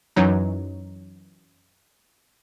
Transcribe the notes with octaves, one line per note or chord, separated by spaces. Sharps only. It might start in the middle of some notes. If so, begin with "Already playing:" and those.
F#2 E3 F#3 D#4